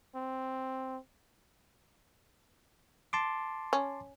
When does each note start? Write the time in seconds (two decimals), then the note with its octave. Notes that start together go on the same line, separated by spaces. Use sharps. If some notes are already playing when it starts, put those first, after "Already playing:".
0.15 C4
3.13 A5 C6 D6
3.73 C#4